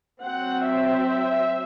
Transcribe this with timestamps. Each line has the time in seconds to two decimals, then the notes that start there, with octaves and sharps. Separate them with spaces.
0.20 F#3 C4 F#5
0.66 E5